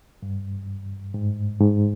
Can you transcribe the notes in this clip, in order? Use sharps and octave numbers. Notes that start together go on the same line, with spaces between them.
G2
G#2
G#2